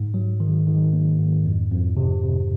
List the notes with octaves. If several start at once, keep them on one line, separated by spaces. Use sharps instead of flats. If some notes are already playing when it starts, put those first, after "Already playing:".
Already playing: G#2
F#3
D#3
D#3
A#3
G#2
F2
F2
C3
C3